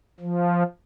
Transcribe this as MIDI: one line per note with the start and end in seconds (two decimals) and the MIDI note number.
0.20 0.63 53